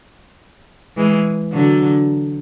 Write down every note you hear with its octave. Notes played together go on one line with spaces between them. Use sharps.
E3 G#3
D3 F#3